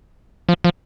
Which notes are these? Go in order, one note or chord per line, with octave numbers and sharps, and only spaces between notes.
F3
F3